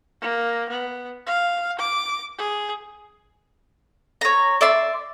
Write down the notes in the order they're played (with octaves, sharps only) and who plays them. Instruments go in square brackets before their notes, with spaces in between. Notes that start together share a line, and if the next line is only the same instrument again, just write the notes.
[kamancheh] A#3
B3
F5
D6
G#4
[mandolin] C#5 A#5
D5 E5 C6